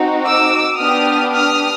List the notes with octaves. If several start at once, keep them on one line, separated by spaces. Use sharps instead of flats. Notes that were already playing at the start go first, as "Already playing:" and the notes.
Already playing: C4 D#4 F#4
D6 E6
B3 D4 G4 D#6 F6
D#6 F6